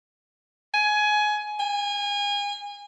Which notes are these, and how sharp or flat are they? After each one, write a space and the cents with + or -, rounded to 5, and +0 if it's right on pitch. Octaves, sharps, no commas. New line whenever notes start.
G#5 +20
G#5 -30